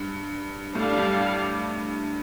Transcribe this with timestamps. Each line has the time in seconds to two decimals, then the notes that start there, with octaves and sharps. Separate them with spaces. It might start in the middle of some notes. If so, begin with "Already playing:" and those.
Already playing: G2
0.75 A2 G3 D4 A4 D5 F5
0.98 G2